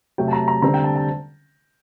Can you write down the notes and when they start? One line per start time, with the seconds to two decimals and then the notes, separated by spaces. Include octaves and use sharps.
0.18 C3 F#3 A3 G5
0.28 A5
0.33 A#5
0.48 A#5
0.62 D3 G3 C4 A#5
0.74 G5
0.84 A5
0.96 A5